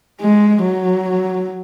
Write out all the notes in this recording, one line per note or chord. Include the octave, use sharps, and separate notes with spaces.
G#3
F#3